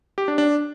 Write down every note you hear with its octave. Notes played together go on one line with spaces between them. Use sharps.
G4
D4
D4